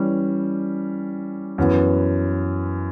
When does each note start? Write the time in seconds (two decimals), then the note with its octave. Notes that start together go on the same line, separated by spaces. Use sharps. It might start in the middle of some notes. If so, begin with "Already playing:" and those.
Already playing: E3 G3 C#4
1.58 F#2 E3 B3